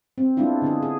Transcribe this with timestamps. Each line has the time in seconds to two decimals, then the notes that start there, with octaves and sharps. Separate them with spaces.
0.18 C4
0.37 G#3 B3 D4 E4 F4
0.62 D3 B3 G#4
0.83 G#4